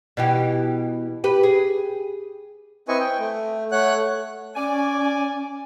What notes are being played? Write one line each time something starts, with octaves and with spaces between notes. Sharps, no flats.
B2 E3 G4
G4 B4
G#4
C4 E4 B4 D#5 G#5 C#6
G5
A3
A3 C#5 F#5 F#6
C#4 D5 G#5